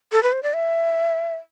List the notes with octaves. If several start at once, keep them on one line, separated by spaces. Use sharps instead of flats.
A4
B4
C5
D5
E5